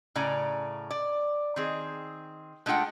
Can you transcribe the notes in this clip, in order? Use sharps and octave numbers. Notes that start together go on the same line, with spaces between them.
A2 C#3 D5 G#5 A#5
D5
D#3 C4 G#4
G#3 A3 D4 F4 F#5 G5